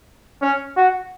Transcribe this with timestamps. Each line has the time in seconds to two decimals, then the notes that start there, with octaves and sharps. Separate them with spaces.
0.42 C#4
0.77 F#4